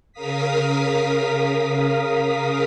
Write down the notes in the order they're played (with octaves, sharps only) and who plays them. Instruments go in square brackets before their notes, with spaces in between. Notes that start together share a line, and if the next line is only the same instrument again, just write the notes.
[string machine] C#3 A#4 F5 D#6 B6